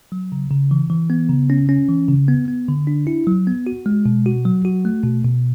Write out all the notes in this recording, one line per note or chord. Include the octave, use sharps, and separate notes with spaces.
F#3
C#3
C#3
E3
E3
B3
C#3
C#4
C#4
E3
C#3
B3
B3
D3
D4
E4
F#3
B3
F#4
G#3
B2
F#4
F#3
F#4
A3
B2
B2